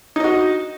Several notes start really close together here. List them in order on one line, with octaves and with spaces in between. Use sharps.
D#4 D#5 F#4